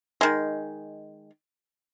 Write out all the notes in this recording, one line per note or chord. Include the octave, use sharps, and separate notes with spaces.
D#3 G#3